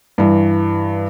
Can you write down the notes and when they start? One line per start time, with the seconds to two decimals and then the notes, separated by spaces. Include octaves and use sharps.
0.18 G2 E3